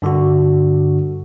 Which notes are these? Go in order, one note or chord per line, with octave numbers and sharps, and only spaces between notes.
G2 D3 D4 F#4